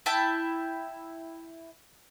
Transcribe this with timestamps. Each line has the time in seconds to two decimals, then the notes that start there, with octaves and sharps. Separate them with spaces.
0.06 E4 E5 G5 A5